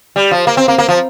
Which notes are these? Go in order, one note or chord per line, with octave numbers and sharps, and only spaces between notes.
G3
F3
A#3
C4
A#3
A#3
F3